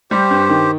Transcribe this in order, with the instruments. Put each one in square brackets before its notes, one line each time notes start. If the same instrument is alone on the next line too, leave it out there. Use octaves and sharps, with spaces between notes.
[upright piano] G3 [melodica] G4 C5
[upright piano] G2
D#3